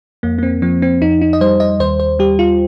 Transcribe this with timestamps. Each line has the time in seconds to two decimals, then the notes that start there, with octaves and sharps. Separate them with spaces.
0.23 F2 A#3
0.38 A#3
0.43 C4
0.62 F3 C4
0.82 C4
1.02 F2 D#4
1.21 D#4
1.33 D#5
1.41 G3 C5
1.60 D#5
1.80 D#2 C5
2.00 C5
2.19 G3 G4
2.39 F4